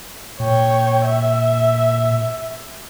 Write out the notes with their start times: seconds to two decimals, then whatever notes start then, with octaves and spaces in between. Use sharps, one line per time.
0.40 A#2 C#5 G5
1.05 E5